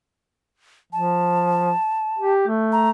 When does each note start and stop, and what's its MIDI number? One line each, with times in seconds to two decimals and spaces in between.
0.93 1.72 53
0.93 2.33 81
2.19 2.43 67
2.48 2.90 57
2.72 2.90 82